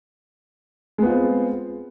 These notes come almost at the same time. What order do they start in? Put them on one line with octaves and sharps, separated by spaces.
G#3 B3 F4 C4